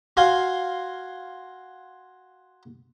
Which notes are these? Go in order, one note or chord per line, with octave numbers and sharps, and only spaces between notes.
F#4 F5 G#5 C6